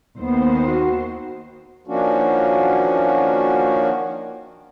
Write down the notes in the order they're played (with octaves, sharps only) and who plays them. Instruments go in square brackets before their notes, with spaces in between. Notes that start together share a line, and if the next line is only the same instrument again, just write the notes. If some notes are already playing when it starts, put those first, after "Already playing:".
[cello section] D#2 D#3 C5 [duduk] B3
[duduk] F#4
[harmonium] D#3 F3 A#3 C#4 D4 F#4